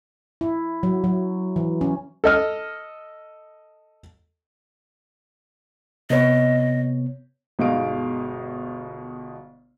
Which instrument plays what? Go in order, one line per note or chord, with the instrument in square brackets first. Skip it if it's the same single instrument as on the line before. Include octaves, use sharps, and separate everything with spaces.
[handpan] E4
F#3
F#3
E3
C#4
[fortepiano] A4 D#5 F6
[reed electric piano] C3 B3 C#5 [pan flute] D#5
[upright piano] G1 B2 G#3 D#4 F5 D7